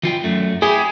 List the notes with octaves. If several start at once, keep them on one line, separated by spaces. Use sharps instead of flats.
E3 F4 G5
F#2 A3
E4 G4 G#4